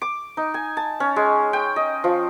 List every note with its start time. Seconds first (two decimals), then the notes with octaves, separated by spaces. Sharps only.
0.02 D6
0.37 D#4
0.54 G#5
0.77 A5
1.00 C#4
1.16 G#3
1.53 G5
1.76 D#5
2.04 F3